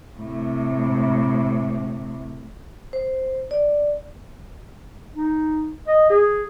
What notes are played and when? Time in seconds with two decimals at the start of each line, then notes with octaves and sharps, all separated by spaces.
0.19 A2 C3
2.93 C5
3.51 D5
5.16 D#4
5.88 D#5
6.10 G#4